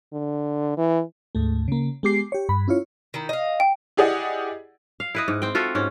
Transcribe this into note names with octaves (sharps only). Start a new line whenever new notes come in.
D3
E3
D2 G#2 A3
C#3 A#3
G#3 B3 G4 D6 C7
G4 C#5
G2 B5
C#4 E4 F4 C#5
D#3 E4
D#5 F5
G5
E4 G4 G#4 D5 D#5 F#5
F5
E4 B4 D#5
G#2
C4 G5
F4 F#4 A4 E5
G#2 C#4